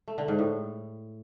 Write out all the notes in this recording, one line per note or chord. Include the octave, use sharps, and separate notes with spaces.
A3
D3
G#2
A2